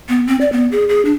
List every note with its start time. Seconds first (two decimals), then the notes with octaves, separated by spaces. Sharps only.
0.09 B3
0.27 C4
0.41 D5
0.52 B3
0.72 G#4
0.89 G#4
1.05 D4